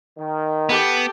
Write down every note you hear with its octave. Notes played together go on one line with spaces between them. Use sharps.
D#3
B3 G4 A4